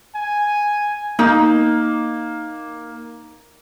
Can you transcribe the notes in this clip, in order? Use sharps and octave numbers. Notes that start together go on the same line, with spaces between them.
G#5
A#3 D#4